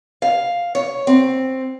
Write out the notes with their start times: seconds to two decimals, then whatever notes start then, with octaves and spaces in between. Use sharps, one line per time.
0.22 F5
0.75 C#5
1.07 C4